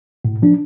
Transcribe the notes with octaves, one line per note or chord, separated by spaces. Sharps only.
A2
F3 D4